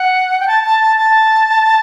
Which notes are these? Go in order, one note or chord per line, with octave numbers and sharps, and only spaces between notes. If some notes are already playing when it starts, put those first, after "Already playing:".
Already playing: F#5
G5
A5
A5
A5
A5